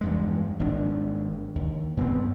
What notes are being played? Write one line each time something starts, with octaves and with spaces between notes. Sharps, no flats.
E2 G2 G#3
G#1 C4 D4
D#2
G2 B3 C4